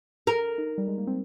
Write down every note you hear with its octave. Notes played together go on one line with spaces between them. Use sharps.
A#4
D#4
G3
G#3
A#3
C4